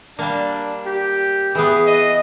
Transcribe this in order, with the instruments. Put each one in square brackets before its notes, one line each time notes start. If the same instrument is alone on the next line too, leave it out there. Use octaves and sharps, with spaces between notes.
[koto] G3 A#3 [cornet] D4
[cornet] G4
[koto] E3 B3 [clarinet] G#4
[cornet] D#5